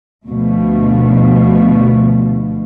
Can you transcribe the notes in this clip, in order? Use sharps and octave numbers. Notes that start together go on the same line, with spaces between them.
D2 B2 F3 A3